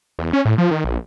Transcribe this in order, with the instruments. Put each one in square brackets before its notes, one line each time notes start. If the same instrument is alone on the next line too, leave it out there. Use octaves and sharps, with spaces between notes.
[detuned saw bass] E2
C#4
A2
F3
D#3
A#1